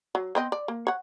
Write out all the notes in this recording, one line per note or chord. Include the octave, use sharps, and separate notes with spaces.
F#3
B3 C4 D#5
D5
A#3
C#5 F#5